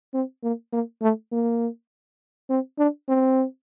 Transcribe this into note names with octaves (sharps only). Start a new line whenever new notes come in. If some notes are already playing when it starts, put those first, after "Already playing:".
C4
A#3
A#3
A3
A#3
C4
D4
C4